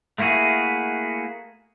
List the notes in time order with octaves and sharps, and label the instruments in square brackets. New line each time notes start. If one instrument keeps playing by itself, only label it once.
[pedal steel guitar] A3 A#3 E4 F#4 G#4